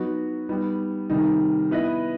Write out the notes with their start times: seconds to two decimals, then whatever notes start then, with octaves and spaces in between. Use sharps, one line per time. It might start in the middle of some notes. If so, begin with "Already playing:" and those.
Already playing: F#3 B3 D#4 F#4
0.49 G3 B3 D#4
1.10 C3 D#3 G3 D#4
1.71 B3 E4 B4 D#5